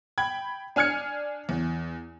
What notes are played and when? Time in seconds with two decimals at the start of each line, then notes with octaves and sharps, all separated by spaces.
0.18 G5 B5 G#6
0.76 D4 G#5 F6 G#6 C#7
1.49 E2